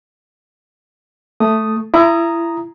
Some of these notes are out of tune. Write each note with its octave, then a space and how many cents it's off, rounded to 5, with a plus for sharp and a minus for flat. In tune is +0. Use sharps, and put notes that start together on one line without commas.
A3 +0 D#6 +0
E4 +25 A#5 +0 D#6 +0